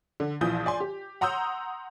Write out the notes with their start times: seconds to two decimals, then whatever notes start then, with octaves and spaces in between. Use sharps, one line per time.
0.20 D3
0.41 A#1 E3 F3 D#6 G6
0.66 D5 G#5 C6
0.80 G4
1.21 F#5 A#5 C6 D#6 E6 G6